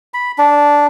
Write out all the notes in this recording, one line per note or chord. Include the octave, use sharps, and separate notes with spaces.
B5
D4